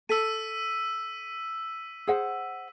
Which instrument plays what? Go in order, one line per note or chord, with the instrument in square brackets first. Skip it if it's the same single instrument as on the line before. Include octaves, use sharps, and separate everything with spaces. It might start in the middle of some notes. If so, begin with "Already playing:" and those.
[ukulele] A4 [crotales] E6 B6 D#7
[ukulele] G#4 C5 F#5